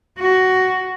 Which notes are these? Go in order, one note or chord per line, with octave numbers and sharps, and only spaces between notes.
F#4